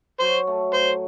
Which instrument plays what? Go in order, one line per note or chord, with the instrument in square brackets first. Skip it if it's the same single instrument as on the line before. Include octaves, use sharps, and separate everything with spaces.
[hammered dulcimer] F#3 [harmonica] C5
[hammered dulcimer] A3
[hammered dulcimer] A2 [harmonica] C5